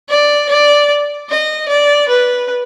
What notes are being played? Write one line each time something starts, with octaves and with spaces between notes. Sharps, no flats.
D5
D5
D#5
D5
B4